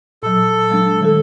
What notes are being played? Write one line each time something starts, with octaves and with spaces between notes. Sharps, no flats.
A#2 F#3 A4
F#3 G#3 D4
D#3 G3 A4